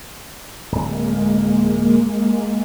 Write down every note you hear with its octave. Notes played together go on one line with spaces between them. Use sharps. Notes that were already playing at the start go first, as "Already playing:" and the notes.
D1 G#3 A#3